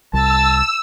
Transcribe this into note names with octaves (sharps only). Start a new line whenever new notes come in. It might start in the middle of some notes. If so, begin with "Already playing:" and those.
C2 A5 E6